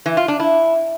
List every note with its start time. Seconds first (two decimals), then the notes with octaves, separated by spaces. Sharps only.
0.06 E3
0.17 F4
0.28 D4
0.40 E4